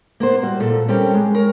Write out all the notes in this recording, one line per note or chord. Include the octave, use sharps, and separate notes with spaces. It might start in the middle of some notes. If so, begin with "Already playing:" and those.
A#3 B3 C5
G3 F#4
A#2 A4
G3 C4 C#4 G4 A4 A#4
G#3
A#4 C#5